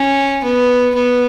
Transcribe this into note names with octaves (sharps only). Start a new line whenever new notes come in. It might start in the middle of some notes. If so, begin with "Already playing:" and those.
Already playing: C#4
B3
B3